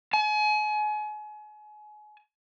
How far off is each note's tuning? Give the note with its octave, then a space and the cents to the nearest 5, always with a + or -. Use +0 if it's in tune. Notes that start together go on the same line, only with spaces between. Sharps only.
G#5 +35